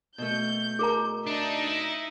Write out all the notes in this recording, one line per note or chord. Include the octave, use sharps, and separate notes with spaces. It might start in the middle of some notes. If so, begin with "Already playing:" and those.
B2 A3 G6
G#4 A#4 A#5
D4 D#4 E5
E4